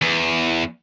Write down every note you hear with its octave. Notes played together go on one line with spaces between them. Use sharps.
E2